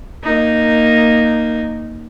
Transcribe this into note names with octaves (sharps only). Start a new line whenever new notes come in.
A#3 D#4